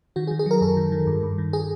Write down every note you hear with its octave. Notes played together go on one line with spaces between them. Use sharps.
D#3 F#4
G#4
D#3
G#4
F#3 A#4
F#2 A4
D#3
D#3
G2
G2
D#3
G#4